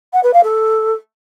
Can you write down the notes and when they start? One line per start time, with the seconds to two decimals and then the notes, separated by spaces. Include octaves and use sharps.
0.13 F#5
0.23 B4
0.33 F5
0.43 A4